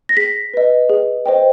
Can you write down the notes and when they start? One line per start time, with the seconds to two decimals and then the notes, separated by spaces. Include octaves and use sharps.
0.09 A#6
0.17 G#4 B6
0.54 B4 D#5
0.89 G#4
1.26 C5 D#5 G5